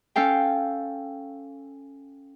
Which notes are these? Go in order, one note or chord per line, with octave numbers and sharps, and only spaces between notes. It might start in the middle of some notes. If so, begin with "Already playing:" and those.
C#4 A4 F5 G5